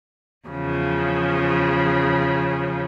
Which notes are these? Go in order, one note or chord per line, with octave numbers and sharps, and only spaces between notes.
E2 C#3 F3